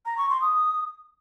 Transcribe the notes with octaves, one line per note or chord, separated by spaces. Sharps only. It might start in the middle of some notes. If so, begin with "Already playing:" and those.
A#5
C#6
C6
D#6